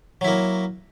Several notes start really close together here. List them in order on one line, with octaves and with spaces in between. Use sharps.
F#3 E4 A#3